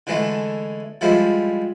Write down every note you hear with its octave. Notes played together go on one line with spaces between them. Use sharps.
D3 E3 G#3 A3
F3 G3 G#3 E4